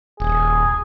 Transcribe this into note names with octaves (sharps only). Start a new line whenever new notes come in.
D#1 G#4